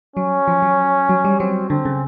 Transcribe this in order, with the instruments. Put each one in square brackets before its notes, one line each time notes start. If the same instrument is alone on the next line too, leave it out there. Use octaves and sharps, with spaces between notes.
[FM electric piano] F#3 [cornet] C#4
[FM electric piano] F3
F#3
F#3
G3
[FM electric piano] F#3 [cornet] C4
[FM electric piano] D3 [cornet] C4
[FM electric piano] C#3